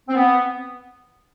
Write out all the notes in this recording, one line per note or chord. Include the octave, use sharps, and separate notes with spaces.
C4
B3